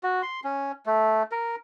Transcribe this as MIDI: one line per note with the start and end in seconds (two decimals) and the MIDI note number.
0.03 0.22 66
0.22 0.40 84
0.44 0.72 61
0.86 1.23 57
1.32 1.56 70